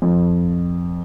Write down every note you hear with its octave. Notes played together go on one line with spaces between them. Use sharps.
F2